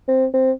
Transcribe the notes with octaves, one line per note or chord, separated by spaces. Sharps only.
C4
C4